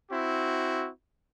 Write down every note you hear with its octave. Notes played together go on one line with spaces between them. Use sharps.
C4 E4 F#4